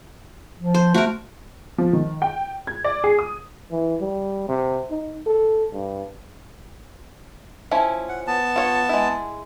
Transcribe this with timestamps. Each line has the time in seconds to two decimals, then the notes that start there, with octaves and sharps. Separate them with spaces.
0.60 F3
0.74 C5
0.94 A3 F#4 A#4
1.78 F3
1.93 D#3
2.22 G5
2.67 G#6
2.84 D5
3.04 G#4
3.19 D#6
3.71 E3
4.01 G3
4.49 C3
4.91 D#4
5.27 A4
5.73 G2
7.71 F3 C#4 E4
8.09 F#5
8.27 B3 A5
8.56 F4 C#5
8.89 G#3 E4